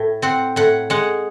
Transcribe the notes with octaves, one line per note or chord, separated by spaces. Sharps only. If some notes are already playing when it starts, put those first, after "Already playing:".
Already playing: A2
C4 F#5
A2 F#5
G#3 F#5